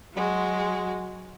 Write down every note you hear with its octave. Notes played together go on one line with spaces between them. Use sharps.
F#3 G#3 F#4